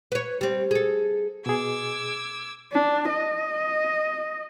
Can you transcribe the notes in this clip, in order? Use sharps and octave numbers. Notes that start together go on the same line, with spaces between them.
B4 C#5
G3 C4
G#4 A4
B2 G#4 D6 E6 G#6
D4
D#5